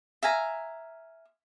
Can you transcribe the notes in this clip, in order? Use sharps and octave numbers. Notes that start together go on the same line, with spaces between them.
E5 F5 G#5 A#5